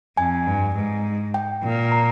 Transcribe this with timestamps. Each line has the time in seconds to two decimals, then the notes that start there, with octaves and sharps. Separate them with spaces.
0.17 F2 G#5
0.46 G2
0.75 G#2
1.34 G5
1.63 A#2
1.92 A#5